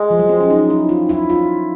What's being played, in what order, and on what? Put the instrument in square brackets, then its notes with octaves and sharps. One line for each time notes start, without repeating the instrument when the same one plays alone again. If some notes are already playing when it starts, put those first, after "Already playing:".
Already playing: [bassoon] G#3
[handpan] F3
F#3
C4
C#4
D#4
E4
F4
E4
F4